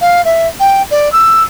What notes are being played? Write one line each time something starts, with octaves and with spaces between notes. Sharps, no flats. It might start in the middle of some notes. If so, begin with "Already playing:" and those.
F5
E5
G5
D5
E6